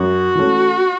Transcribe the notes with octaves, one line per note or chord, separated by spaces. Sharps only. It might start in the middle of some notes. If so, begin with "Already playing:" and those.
Already playing: F#2 F#4
E3 A3 C#4